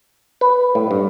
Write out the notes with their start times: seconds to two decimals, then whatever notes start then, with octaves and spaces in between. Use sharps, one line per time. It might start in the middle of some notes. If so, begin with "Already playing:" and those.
0.41 B4
0.75 A2
0.91 G2